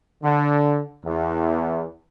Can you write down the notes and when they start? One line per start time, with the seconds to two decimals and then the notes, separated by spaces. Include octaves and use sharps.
0.23 D3
1.05 E2